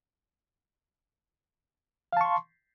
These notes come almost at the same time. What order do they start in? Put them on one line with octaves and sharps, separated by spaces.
F5 A5 C#6 C6